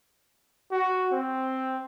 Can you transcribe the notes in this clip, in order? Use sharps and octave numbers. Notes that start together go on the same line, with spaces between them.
F#4
C4